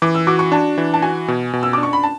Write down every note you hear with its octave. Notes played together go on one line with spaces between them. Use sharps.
E3 D6
E6
F#4 D6
C#6
D4 A5
E3
A5
F#4 G#5
B2
B2
E6
D4 D6
C#6
B5
A5